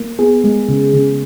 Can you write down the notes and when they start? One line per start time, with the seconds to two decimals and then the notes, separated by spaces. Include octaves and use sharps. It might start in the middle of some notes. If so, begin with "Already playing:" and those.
Already playing: A#3
0.19 B3 G#4
0.44 G#3
0.69 C#3
0.94 C#3